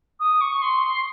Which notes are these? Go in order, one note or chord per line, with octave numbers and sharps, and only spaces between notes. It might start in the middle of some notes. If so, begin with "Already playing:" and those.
D#6
C#6
C6